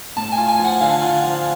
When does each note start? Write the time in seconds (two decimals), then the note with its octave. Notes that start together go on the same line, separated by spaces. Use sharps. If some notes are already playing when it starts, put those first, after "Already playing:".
0.16 A2 A5
0.32 G#5
0.38 F4
0.48 G#5
0.59 F3
0.64 F#5
0.81 D3 F5
1.02 F4
1.23 F3